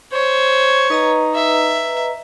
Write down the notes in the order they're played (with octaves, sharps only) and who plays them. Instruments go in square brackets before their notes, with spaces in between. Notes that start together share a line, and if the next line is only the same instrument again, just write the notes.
[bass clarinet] C5 [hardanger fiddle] C#5
[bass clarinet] D#4 [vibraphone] B4 D#5 A#5
[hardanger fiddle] E5